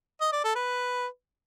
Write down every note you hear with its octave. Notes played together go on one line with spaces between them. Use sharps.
D#5
D5
A4
B4